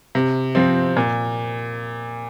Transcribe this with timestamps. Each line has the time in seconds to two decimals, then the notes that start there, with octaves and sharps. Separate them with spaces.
0.15 C3
0.55 F3 C4
0.97 A#2